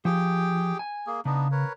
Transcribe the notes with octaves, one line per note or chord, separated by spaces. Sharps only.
F3 G4 G#4 G5
G#5
A#3 G#4
C#3 B3 D4 D#4
A#4 B4 C#5